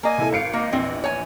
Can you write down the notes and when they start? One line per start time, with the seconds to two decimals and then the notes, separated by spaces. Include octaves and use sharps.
0.03 A#3 D#5 G#5
0.18 C3 E4 A4
0.33 G#1 F5 C#7 D7
0.53 A#3 D#5
0.73 A#1 E2 C4
1.04 C#5 G#5